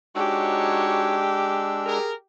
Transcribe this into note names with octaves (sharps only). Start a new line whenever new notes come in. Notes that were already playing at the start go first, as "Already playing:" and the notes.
G#3 D4 D#4 F#4 G4 C#5 E6
G#4 A#4